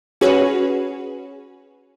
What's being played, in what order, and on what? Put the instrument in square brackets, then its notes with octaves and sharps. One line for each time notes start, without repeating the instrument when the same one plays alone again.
[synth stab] C#4 F#4 G#4 B4 C#5